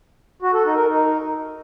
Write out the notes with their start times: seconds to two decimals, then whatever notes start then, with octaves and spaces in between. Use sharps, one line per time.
0.42 F#4
0.54 A4
0.65 D#4
0.76 A#4
0.87 D#4